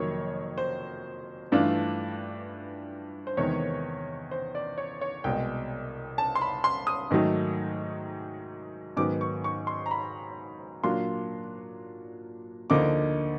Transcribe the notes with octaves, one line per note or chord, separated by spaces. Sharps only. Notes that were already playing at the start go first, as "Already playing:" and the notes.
Already playing: F2 C3 D#3 F#3 A#3 C#5
C5
G2 E3 A3 D4 F4
C5
E2 C3 D#3 G#3 B3 C#5
C5
D5
C#5
C#5
C2 B2 G#3 G5
A5
C6
B5
C6
D#6
G#2 D#3 F#3 A3
G#2 D#3 F#3 B3 D6
C#6
C#6
C6
A#5
B5
A#2 F#3 A#3 D4 F4 C6
D2 D3 F3 A#3 D#4 D6